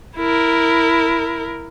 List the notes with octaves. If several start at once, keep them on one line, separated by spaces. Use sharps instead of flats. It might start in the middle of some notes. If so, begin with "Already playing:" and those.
E4 A#4